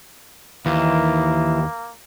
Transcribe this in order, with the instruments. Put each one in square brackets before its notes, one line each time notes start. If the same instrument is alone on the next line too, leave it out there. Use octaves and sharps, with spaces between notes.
[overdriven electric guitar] D#2 [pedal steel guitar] E3 [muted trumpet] A#3